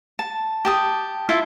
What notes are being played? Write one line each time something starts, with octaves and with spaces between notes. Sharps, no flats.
A5
G4 A5 D#6
E4 F4 A4